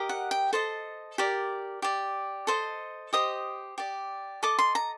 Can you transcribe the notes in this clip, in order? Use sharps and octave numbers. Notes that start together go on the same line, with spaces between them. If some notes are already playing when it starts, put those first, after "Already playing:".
Already playing: G4 A#4 D#5
F#5
G5
A4 C5 D#5 A5
G4 A#4 D5
G4 D5
A4 C5 D#5
G4 C5 D#5 D#6
G4 D5
A4 D#5 D6
C6
A#5